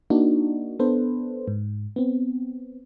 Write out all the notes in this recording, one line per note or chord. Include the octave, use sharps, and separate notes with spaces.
A#3 D4 D#4 F#4
B3 D4 A4 B4 C5
G#2
B3 C4